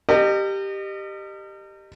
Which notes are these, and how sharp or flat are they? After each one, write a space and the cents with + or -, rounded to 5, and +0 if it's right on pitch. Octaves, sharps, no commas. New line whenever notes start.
G4 +0 A#4 -40 D#5 -30